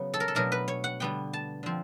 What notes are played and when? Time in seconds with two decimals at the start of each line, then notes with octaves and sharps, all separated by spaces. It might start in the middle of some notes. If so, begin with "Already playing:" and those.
Already playing: C#3 F#3 B3
0.14 A4
0.20 A#4
0.28 A4
0.35 B2 F#3 A3 D4 A#4
0.52 B4
0.68 C#5
0.84 F#5
1.00 D3 G3 B3 D4 G5
1.33 A5
1.63 D3 F3 C4